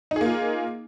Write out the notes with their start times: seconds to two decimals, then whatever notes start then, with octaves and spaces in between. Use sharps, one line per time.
0.11 D#4
0.16 G#4
0.21 A#3
0.26 F4